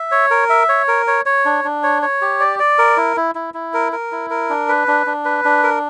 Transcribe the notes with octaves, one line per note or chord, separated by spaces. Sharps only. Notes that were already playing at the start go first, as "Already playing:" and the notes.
Already playing: E5
C#5
A#4
E5
C#5
A#4
C#5
C#5
D4
D4
C#5
C#5
G4
D5
D5
A#4
E4
E4
E4
E4
A#4
A#4
E4
A#4
D4
B4
D4
D4
B4
D4
A#4